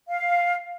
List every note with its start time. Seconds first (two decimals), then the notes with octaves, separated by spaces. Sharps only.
0.08 F5